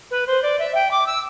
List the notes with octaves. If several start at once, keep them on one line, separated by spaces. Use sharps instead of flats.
B4
C5
D5
E5
G5
D6
E6